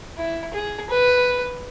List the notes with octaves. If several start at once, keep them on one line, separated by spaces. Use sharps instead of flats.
E4
G#4
B4